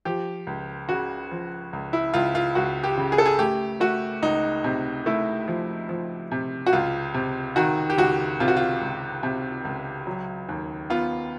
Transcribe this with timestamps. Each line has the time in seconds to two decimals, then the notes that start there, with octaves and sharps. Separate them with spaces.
0.05 F3 G4
0.47 C#2
0.89 C#3 F#4
1.31 F3
1.73 C#2
1.93 E4
2.14 C#2 F4
2.35 F4
2.55 C#2 F#4
2.84 G4
2.97 C#3
3.12 G#4
3.18 A4
3.26 G#4
3.39 A3 G4
3.80 A3 F#4
4.22 C#2 D#4
4.64 C3
5.06 A3 E4
5.48 F3
5.89 F3
6.32 C3
6.66 F#4
6.73 C#2 F4
7.14 C3
7.56 D#3 F#4
7.90 G4
7.98 C#2 F#4
8.40 C3 F4
8.48 F#4
8.57 F4
8.81 C#2
9.23 C3
9.65 C#2
10.07 F#3
10.48 D#2
10.90 B3 F4